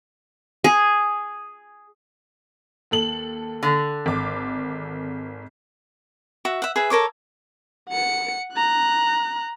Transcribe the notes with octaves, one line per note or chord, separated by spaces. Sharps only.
G#4
D#2 A4 F#7
D3
G#1 D6
F#4 E5
E5 F#5
G#4 B4 E5
A4 A#4 C#5 D6
F#5 C#7
A#5 F#6